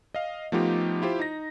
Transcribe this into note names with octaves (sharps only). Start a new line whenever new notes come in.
D#5 F5
F3 A3 B3 D#4 F4 G4
E4 F4 G4 C5
D#4 A#6